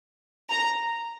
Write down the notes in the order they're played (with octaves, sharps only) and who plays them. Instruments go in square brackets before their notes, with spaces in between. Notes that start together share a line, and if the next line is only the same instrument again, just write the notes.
[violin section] A#5